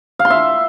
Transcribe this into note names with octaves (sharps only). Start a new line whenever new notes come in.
F5
C6
E5